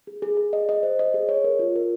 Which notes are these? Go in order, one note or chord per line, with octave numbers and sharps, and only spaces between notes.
G#4
G#4
G#4
D#5
D#5
C5
D#5
G#4
C#5
A#4
F4
A#4